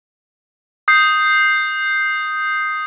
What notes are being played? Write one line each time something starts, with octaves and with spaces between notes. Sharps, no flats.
D#6 G6 C7